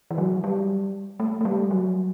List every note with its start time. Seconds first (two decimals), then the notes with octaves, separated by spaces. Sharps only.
0.11 E3
0.18 F#3
0.44 G3
1.20 A3
1.41 A3
1.45 G3
1.71 F#3